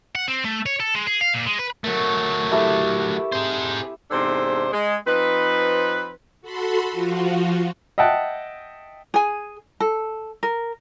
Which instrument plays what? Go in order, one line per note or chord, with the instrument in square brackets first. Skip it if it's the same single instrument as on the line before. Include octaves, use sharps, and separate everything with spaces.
[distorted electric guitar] F#5
C4
A3
C#5
A4
G#3
G#4
F5
A#2
G#3
B4
[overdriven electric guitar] F#3 A3 [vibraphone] A#4 C#6
[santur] E4 G4 A4
[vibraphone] C4 [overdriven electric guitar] G#4 C5
[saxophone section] E2 G#2 C3 D4 A4 C5
G#3
F3 C4 D#4 B4
[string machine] F#4 A4 B5 C6
F3 F4 F#4
[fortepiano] D#5 E5 F#5 G5 A5
[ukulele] G#4 G#5
A4
A#4